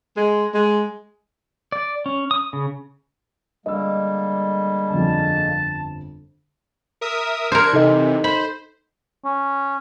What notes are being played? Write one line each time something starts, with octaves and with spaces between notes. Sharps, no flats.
G#3
G#3
D5
C#4
D#6
C#3
D3 G3 G#3 A#3 D#5 E6
G1 F2 A5
A#4 E5 D#6
D4 A#4 C5 G#6 C#7
C3 E3 D#4 A4 D#5
C5 B5
C#4